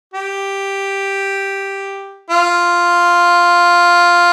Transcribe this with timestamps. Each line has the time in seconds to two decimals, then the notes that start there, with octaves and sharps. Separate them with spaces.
0.14 G4
2.31 F4